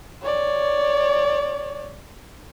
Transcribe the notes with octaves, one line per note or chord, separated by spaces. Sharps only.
C#5 D5